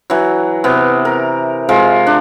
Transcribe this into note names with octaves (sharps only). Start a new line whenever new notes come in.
E3 F#3
C3 B3
A#4
C3 G#3 F4
D4